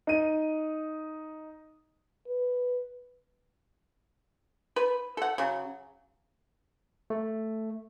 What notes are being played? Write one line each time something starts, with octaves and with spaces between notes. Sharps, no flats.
D#4 D#7
B4
B4
A4 F#5
C#3 F#3
A3